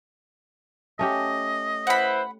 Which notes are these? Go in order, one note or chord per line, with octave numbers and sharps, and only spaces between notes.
A3 C#4 G4 D#5
E4 B4 C5 F#5 B5